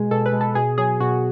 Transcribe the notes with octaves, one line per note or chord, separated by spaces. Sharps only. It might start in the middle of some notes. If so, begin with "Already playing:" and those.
Already playing: B2 G#3 G#4
B2 A4
B4
G#3
A4
B2 G#4
F#3 G#4
B2 F#4